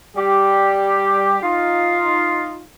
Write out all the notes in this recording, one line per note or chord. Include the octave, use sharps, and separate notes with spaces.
G3 G4
D#4 F4